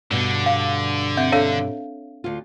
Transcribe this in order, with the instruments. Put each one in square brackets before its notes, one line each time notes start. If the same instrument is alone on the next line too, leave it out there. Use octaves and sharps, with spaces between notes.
[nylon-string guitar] G2 B2 [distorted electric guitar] D3
[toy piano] F5
[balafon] C4 [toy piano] E5
[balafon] D4 A4 [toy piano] C#5 F5
[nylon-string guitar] D2 F4